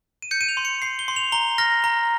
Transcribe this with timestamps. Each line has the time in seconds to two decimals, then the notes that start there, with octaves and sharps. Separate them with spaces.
0.22 D#7
0.31 G6 C#7
0.41 D#7
0.49 F7
0.57 C6
0.65 C#7
0.82 C6 C7
0.99 G7
1.08 C6
1.16 F7
1.32 A#5 G7
1.58 F6 A#6
1.84 A#5